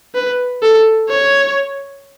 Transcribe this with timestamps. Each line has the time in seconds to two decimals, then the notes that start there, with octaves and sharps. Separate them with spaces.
0.15 B4
0.62 A4
1.09 C#5